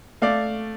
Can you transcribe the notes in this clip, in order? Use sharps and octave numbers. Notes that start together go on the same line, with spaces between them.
A3 D5 F5